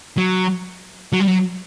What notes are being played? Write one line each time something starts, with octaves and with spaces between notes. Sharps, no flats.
F#3
F#3
G3
F#3